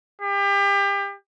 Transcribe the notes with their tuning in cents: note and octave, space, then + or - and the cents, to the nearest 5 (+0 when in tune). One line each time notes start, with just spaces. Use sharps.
G4 +30